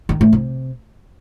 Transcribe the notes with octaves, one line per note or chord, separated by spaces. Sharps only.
D#3
A2
C3